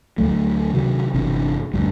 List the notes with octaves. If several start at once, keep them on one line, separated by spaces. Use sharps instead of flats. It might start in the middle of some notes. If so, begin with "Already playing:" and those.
D2 F#3 A3
C3 D#3 F#3
G1 C3 E3
D2 G2 G3